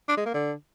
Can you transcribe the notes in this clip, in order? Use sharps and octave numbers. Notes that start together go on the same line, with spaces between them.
D4
G#3
A#3
D3